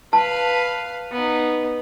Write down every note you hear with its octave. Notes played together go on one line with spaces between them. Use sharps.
B4 F5 A5
B3 D#4